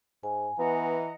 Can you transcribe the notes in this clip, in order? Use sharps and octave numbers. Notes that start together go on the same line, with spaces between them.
G#2 G#5
E3 B3 D#5 F#5 A#5